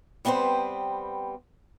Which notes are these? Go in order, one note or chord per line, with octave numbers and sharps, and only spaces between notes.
G3 B3 C4 B4 C5